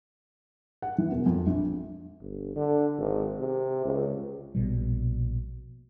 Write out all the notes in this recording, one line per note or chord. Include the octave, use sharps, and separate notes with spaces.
F#5
E3
E1
F2
A#1
G1
D3
G#1
C3
C#2
A#1 B2 G3